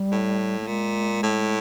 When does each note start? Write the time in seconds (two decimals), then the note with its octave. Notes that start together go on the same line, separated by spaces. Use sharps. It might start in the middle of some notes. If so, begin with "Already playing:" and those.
Already playing: G3
0.12 A2
0.61 A3
0.67 A#2 G#3
1.23 A2